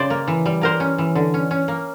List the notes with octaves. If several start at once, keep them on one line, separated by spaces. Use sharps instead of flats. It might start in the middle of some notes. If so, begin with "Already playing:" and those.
Already playing: C#3 C5 D5
A#3
E3
G3
A#3 A#4 C5
C#4
E3
D3
C#4
C#4
A#3